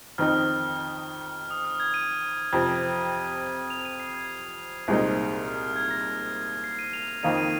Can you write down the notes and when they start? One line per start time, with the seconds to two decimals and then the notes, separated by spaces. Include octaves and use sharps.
0.18 F2 D#3 C4 D#4 F6
1.51 D#6
1.65 F6
1.80 G#6
1.94 D#7
2.53 F2 C3 F3
3.70 F7
3.85 D#7
4.00 C7
4.15 G#6
4.88 C2 A#2 G#3 C4 D#4
5.47 F6
5.61 F6
5.76 G#6
5.91 A#6
6.64 C7
6.79 D#7
6.93 F7
7.08 F7
7.23 F2 D#3 A#3 D#4 D#7
7.37 D#7